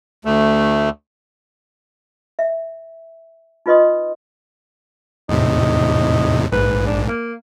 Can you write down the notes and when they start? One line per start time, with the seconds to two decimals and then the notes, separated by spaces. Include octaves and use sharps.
0.25 D2 A3
2.39 E5
3.66 D#4 F4 B4 D#5 C6 D#6
5.29 E2 A2 C3 D#4
6.52 A#1 G#2 B4
6.87 D4
7.08 A#3